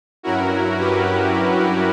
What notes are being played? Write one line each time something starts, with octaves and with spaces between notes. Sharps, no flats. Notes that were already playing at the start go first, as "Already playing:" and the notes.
G2 F#3 C#4 E4 F#4 A#4
G4 B4